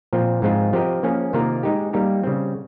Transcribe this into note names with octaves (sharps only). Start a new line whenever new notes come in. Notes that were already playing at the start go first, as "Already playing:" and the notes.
A#2 F3 C4
G#2 F3 G#3 C4 F4
F3 C4 G4 A#4 D#5
F3 A#3 C#4 G#4
C3 D#3 A#3 F4 A#4
G#3 D#4 G4
G3 A#3 D#4 G4
C#3 G3 C4